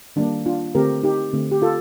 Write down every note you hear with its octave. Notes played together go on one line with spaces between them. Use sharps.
D#3 G3 A#3 D4
D4 F4
D3 A3 C4 G4 A#4
D#4 G4
D3 A3 C4
G4
F4 A4